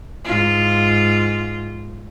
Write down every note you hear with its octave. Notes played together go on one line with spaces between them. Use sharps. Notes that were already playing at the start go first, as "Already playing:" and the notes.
G#2 F4